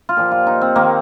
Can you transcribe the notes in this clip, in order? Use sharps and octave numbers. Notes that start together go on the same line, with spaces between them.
F4
A#2 F3 G4
F4
D#4
C4
D#3 A#3